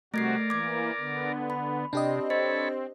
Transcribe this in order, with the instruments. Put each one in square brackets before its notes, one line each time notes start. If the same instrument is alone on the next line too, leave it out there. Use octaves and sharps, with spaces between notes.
[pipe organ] C3 G3 F#4 [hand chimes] A3 G#6 C7 [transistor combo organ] A#4 D5
[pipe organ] E3 A#3 [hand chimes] D6 G#6
[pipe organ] D3 B3
[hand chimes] B5
[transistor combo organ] C3 [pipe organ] C4 [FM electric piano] D4 G4 D#5
[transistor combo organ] A4 C#5 B5 [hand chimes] C5